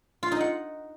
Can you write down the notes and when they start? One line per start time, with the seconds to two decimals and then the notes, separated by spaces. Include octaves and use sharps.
0.23 F4
0.32 D#4
0.41 F#5